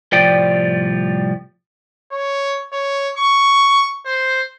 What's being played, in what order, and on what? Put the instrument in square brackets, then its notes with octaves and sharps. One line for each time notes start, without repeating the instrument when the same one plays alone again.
[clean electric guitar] C2 A2 F3 G3 D5 G5
[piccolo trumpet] C#5
C#5
C#6
C5